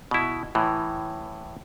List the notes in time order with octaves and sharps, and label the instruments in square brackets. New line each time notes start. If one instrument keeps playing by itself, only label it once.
[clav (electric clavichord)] B2 E4
A2 E3